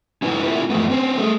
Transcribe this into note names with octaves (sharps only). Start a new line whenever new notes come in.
C#4 D#4 E4 B4
C#4 E4 F4 G4 A#4 E5
F#2 E3 F3 G#3 A3 B3
C4 C#4 C5
A3 G#4